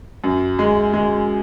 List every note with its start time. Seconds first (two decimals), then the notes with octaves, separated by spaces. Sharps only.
0.24 F#2
0.59 G#3
0.93 G#3